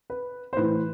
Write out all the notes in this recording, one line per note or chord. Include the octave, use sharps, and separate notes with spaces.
B4
C5
A2 E3 B4